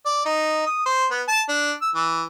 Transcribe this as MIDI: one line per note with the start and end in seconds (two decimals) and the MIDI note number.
0.06 0.21 74
0.25 0.62 63
0.66 0.82 87
0.86 1.05 72
1.11 1.22 59
1.28 1.41 81
1.49 1.72 62
1.82 1.90 88
1.95 2.23 52